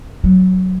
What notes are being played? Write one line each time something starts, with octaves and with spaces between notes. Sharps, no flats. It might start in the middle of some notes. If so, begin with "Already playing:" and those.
F#3